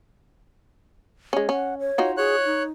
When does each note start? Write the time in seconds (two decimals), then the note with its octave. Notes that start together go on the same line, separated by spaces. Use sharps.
1.33 G#3 C#4
1.49 C#4 F#5
1.79 C#5
1.98 D#4 F4 F#4
2.17 G#4 C#5 F#6
2.46 D#4